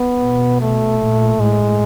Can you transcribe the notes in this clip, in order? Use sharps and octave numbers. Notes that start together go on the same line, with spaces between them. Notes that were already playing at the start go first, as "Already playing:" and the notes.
Already playing: B3
B2
A3
A#2
A2 G#3